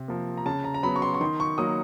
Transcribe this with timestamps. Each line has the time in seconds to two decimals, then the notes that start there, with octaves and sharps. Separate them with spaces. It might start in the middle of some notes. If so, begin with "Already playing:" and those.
Already playing: C3
0.08 F3 A#3
0.37 A#5
0.46 C#3 A5
0.64 A#5
0.74 A#5
0.83 F#3 B3 B5
0.96 C#6
1.02 C6
1.14 C#6
1.21 D#3 C6
1.40 C#6
1.58 F#3 A#3 D#6